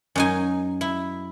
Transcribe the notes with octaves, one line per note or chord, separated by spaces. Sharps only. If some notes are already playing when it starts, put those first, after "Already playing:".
F#2 D#4 G#5
E4